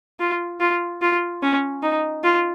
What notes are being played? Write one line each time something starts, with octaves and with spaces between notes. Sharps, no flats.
F4
F4
F4
C#4
D#4
F4